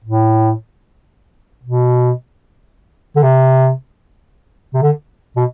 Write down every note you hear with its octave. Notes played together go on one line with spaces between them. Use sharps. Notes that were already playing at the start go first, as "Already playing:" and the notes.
A2
B2
D3
C3
C3
D3
B2